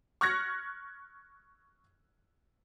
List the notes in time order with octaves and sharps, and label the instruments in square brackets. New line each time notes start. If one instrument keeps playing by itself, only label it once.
[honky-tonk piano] C#6 F6 F#6 G#6 A#6 C#7